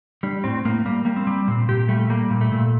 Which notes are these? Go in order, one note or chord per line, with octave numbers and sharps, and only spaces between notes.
G3 D4
A2 C4
A2 A#3
G3 A#3
G3 A#3
C4
G3
A#2 C4
A#2 G4
G3 A3
G3 A#3
A#2
A3
A#2